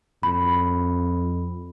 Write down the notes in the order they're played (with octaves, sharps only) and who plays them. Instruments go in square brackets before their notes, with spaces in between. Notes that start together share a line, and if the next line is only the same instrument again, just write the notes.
[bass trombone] F2 [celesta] B5